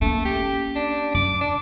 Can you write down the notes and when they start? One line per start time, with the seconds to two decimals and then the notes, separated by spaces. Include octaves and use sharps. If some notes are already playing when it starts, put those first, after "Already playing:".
0.01 A3 A#3 C#4
0.25 G4
0.76 D4
1.15 F#2 D6
1.41 D4